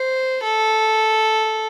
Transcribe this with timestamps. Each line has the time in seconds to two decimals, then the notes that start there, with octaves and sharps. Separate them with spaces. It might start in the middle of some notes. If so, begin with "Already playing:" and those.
Already playing: C5
0.43 A4